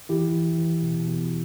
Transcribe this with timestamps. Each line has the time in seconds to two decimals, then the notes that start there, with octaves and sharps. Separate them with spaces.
0.09 E3 E4 G4
0.34 E3
0.58 E3
0.82 B2
1.07 B2